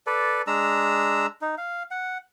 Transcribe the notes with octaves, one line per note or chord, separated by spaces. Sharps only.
A4 B4 D5
G#3 D4 A#5 E6
D#4
F5
F#5